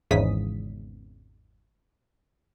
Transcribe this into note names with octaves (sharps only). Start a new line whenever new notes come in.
G#1 E2 G#2 C#3 D#6 B6